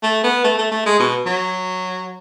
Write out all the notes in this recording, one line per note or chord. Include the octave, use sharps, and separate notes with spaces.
A3
B3
A3
A3
A3
G#3
B2
F#3